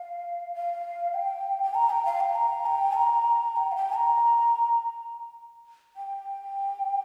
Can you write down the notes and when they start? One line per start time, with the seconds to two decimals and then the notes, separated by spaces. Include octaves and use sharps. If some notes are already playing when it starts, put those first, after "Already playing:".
Already playing: F5
0.54 F5
1.14 G5
1.63 G5
1.75 A#5
1.90 G5
2.05 F5
2.20 G5
2.35 A#5
2.66 G5
2.95 A#5
3.56 G5
3.72 F5
3.76 G5
3.96 A#5
5.96 G5